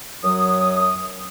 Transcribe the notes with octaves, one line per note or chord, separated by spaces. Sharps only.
F#2 F#3 D#6